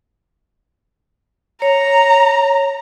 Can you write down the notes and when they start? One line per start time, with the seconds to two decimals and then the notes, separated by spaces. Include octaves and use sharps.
1.62 C#5 A#5